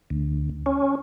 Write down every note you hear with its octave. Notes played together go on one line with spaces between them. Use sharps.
D2
C#4